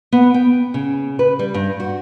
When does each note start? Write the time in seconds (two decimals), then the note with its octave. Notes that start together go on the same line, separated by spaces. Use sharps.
0.12 B3
0.34 G5
0.74 C#3
1.19 B4
1.39 G3
1.54 G2
1.80 F#4